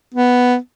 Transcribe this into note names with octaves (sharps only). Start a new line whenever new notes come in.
B3